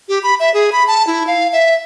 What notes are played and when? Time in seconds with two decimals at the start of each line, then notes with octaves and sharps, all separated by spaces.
0.09 G4
0.23 B5
0.40 E5
0.54 G#4
0.72 B5
0.87 A5
1.07 E4
1.27 F5
1.53 E5